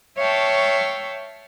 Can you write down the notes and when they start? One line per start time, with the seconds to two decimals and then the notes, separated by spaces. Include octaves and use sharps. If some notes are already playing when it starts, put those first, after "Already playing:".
0.18 C#5 E5 F5 G5 A5 C#6